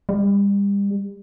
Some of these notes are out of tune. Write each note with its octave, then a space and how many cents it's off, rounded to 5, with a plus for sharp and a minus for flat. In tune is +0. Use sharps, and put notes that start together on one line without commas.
G3 +35